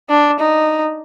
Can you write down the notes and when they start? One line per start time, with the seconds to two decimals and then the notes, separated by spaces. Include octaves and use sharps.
0.10 D4
0.40 D#4